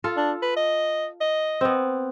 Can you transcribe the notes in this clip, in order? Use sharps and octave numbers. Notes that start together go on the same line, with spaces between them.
F4 A4
D4
B4
D#5
D#5
B3 C4